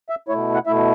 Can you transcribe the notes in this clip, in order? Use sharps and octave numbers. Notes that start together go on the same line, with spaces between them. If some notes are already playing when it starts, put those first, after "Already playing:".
E5
B2 A3 E4 C#5
F#5
B2 A3 E4 E5